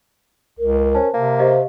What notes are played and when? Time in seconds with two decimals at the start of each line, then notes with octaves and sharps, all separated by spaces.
0.59 C#2 A#4
0.94 C#4 C5 A5
1.13 C3 A#3
1.39 G4 C5 D#5 F5